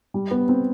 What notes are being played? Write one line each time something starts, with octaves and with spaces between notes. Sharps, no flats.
G3
B3
C4